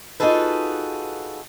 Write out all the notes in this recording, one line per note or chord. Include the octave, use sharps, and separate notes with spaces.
D#4 F4 F#4 G#4 A4 B4